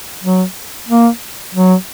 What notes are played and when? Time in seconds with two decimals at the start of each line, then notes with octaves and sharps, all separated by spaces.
0.24 F#3
0.88 A#3
1.55 F#3